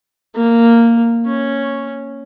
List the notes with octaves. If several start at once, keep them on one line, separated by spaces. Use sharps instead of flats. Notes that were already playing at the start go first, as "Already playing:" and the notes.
A#3
C#4